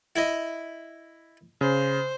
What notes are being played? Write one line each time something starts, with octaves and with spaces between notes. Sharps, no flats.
E4 D#5
C#3 C5